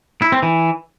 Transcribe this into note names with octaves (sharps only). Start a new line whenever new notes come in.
E4
C4
E3